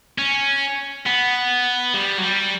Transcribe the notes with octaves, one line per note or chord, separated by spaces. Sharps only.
C#4
B3
G3
F#3
G3